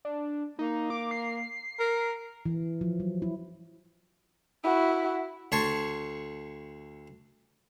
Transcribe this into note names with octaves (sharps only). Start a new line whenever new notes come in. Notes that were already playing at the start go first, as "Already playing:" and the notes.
D4
A#3 D#4
D6
C7
A#4
E3
F3
F#3
E4
E4 F#4
D2 C#5 A5 C6 C#6